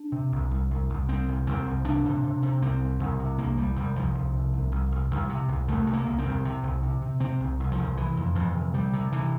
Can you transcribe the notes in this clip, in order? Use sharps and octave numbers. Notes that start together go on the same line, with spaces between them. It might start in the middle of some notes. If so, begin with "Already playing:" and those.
Already playing: D4
C3
C2
C2
C2
C2
C2 C4
C2
C2 C4
C2
C3 D4
C3
C3
C3
C2 C4
C2
C2
C3
C2 A#3
C2 G3
C2 G3
C2 F3
C2
C3
C2
C2
C2
C2
C3
C2
C2 A3
C3
A#3
C2
C4
C2
C3
C2
C3
C3
C3 C4
C2
C2
F3
C2
C3 E3
F2
F2 E3
C3
C3 G3
C3
C3 E3